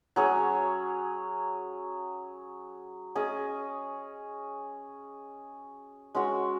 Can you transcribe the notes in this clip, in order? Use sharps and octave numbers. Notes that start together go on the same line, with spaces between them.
F#3 C#4 G#4 C#5
C#4 G#4 D#5
G#3 C#4 F#4 C#5